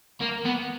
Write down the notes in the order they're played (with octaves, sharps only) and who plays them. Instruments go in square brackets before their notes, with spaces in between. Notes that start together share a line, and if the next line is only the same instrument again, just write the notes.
[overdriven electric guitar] A#3
B3